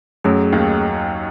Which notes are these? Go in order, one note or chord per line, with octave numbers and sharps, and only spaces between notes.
F#2 F#3 A3 C#4 G#4
D#2 D#3